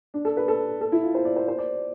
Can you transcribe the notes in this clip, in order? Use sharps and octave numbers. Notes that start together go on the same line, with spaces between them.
D4
A4
B4
A4
A4
E4
F4
C5
D5
C5
C5
D5